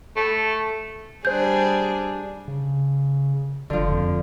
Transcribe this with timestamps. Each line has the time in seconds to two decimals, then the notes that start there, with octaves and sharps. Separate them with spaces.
0.16 A3
1.25 G3 D4 G#4 C5 G6
2.48 C#3
3.70 F#1 D3 F3
3.91 F2